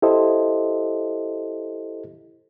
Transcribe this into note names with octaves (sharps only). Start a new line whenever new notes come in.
E4 G4 A4 C5 D#5